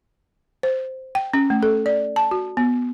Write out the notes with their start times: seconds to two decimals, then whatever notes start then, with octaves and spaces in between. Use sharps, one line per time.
0.63 C5
1.15 G5
1.33 C#4
1.50 A3
1.63 A4
1.86 D5
2.16 A5
2.31 F#4
2.57 B3